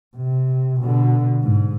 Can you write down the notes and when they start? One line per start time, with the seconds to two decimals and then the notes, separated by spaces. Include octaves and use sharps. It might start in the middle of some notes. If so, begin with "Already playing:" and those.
0.17 C3
0.81 B2 D3
1.43 G#2